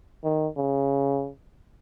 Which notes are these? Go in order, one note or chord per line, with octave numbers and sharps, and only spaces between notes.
D#3
C#3